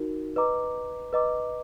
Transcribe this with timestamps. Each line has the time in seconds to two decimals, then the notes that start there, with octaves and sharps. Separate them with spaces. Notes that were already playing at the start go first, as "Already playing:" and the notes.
Already playing: D#4 F#4 A#4
0.36 B4 D#5 A#5 D6
1.13 B4 D#5 A#5 D6